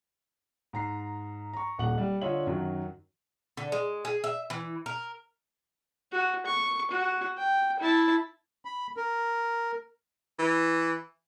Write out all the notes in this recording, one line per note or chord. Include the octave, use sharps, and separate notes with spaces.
G#2 A#5 C7
A#5 C#6
D#1 F#5 F#7
G3
D3 F4 C#5 D#5 E5 F#7
F#2 D#3 F#3
D3
G#3
G#4
E5
E3
A#4
F#4
C#6
F#4
G5
E4 A5
B5
A#4
E3